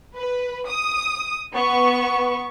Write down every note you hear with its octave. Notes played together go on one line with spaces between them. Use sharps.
B4
D#6
B3 C#6